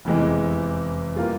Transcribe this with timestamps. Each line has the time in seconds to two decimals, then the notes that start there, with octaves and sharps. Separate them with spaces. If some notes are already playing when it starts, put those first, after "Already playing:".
0.05 F1 E2 C3 E3 G#3
1.16 G3 A#3 F4